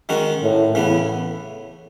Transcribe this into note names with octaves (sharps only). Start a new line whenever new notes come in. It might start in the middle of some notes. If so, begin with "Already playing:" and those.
D#3 G#3 C#4 F#4
A2
A2 C#3 E3 B3